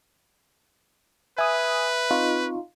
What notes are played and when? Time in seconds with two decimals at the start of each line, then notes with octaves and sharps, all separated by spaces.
1.38 B4 E5 G#5 D#6
2.11 C4 D#4 F4 C#6